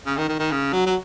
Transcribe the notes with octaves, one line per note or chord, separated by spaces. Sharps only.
C#3
D#3
D#3
D#3
C#3
F#3
F#3